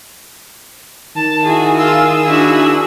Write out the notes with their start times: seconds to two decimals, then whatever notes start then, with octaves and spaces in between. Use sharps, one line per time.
1.16 D#3 A5
1.45 E4 F#4 G#4
1.78 F4 G#4 E6
2.26 D4 E4 F#4